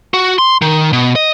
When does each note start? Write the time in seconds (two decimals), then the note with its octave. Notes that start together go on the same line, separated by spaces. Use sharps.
0.14 F#4
0.38 C6
0.62 D#3
0.93 B2
1.16 D#5